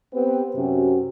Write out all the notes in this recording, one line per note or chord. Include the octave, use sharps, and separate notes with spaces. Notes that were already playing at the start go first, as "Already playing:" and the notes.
B3 C4 G4 B4
F#2 C3 C#4 F#4